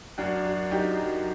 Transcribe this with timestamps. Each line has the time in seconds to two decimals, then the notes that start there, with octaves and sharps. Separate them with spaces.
0.18 F#2 D4 F#4
0.45 F#3
0.71 F#2 D#4 G4
0.97 F#3